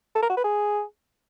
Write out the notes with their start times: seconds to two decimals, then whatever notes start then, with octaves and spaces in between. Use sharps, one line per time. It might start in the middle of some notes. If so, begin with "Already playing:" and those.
0.15 A4
0.22 A#4
0.30 F#4
0.37 B4
0.44 G#4